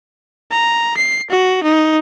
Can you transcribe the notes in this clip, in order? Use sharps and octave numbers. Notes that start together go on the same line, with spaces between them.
A#5
C7
F#4
D#4